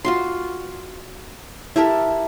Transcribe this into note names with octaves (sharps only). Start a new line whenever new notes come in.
F4 F#4 C6
E4 G4 A4 A#4